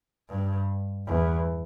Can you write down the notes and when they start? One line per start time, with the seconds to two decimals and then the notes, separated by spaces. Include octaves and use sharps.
0.29 G2
1.07 E2